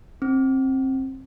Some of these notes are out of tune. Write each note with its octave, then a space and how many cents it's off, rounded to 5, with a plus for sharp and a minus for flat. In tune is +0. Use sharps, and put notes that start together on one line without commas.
C4 +25